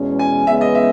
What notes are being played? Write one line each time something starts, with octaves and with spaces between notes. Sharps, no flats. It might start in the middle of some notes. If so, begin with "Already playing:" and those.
Already playing: E2 B2 G#3 C#4
G#5
E2 C#3 G#3 B3 E5
D#5
E5